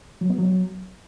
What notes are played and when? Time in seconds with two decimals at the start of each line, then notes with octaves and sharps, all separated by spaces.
0.21 F#3
0.30 B3
0.38 F#3